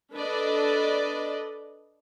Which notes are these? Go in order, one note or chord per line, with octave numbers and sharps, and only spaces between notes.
D4 A4 B4 D5 D#5